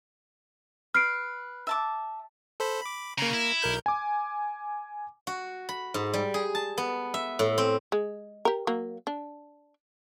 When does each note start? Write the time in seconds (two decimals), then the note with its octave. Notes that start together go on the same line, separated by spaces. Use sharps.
0.94 B4 F6 C7 D7
1.67 E5 A5 D6
2.60 A4 C5 B5
2.81 B5 D6
3.18 C#3 A#3 A#5
3.33 E4
3.62 B1 A#4 G6
3.86 G#5 D6
5.27 F#4
5.69 B5
5.94 G#2
6.14 G3
6.34 G#4
6.55 A5
6.78 B3
7.14 E5
7.39 A2
7.58 C4
7.92 G#3
8.45 G4 A#4
8.67 F#3 A#3
9.07 D4